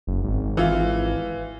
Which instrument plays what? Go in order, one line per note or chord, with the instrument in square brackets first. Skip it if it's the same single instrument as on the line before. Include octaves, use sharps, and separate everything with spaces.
[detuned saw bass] F#1
G#1
[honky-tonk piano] E3 F4